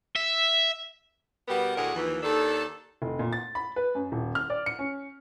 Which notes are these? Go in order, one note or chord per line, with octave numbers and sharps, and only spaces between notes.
E5
B2 G3 B3 G4 A#4 F#5
D2 A2 D3 G#4 A#4 F#5
D#2 E3 F3
D#2 D#3 D4 A4
F1
A#2
A6
B5
B4
F#2
D#1
F6
D5
C#7
C#4